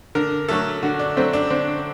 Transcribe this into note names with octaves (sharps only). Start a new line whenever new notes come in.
D3 A#4
F#3 A3 A4
D3 F#4
D4
F#3 A3 C4
D4
D3 C4